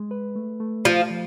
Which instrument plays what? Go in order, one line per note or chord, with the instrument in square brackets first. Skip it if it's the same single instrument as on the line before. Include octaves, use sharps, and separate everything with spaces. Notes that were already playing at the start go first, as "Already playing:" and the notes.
Already playing: [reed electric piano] G#3
B4
A3
A3
[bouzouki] F3 [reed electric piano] F4
[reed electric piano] F3